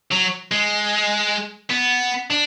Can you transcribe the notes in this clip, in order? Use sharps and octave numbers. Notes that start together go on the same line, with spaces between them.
F#3
G#3
B3
D4